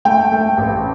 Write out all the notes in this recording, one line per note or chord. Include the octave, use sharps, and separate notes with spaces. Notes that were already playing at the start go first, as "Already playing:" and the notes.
A3 G5
A3
A1